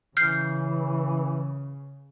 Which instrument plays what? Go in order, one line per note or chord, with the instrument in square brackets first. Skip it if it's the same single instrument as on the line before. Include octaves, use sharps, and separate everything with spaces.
[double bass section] C#3 [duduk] E3 [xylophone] F6 G6 C7